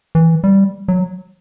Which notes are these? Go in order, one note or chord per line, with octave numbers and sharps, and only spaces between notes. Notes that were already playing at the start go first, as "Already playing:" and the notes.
E3
G3
F#3